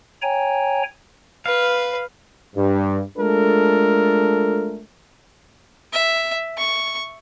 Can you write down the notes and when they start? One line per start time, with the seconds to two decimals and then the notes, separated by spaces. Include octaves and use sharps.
0.22 C#5 G5 G#5 A#5
1.46 B4 F5
2.56 G2
3.18 G#3 A3 D4 F4 A4 A#4
5.93 E5
6.58 C#6